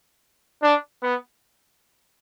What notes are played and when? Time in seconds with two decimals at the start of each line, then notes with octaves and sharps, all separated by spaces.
0.63 D4
1.03 B3